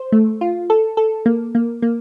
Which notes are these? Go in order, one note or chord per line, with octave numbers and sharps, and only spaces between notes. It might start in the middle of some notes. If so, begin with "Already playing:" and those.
Already playing: C5
A3
F4
A4
A4
A#3
A#3
A#3